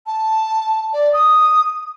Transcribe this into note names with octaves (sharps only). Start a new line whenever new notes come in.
A5
D5
D#6